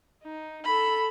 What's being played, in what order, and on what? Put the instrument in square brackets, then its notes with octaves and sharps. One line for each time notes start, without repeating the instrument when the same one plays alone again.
[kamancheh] D#4
A4 B5